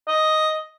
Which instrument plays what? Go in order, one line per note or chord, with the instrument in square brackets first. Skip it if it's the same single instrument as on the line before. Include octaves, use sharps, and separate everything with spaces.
[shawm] D#5